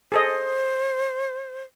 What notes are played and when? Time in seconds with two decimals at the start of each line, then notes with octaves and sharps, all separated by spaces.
0.12 G#4 A4 C5 D#5